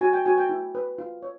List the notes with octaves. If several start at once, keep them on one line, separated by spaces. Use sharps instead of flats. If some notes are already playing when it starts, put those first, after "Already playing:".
F#4 G#5
G5
F#4 G#5
G5
E4
B4
F4
C#5